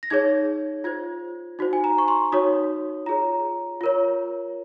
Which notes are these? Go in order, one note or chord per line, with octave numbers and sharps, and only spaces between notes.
A#6
D#4 G#4 C#5 G#6
F4 C5 G#6
D#4 F#4 C5
G#5
A#5
C#6
C6
D#4 F#4 C#5 D#6
F4 G#4 C#5 A#5
F4 A#4 C#5